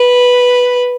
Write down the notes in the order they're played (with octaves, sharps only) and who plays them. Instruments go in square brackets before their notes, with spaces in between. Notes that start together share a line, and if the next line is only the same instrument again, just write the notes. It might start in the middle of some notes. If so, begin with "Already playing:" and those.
Already playing: [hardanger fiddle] B4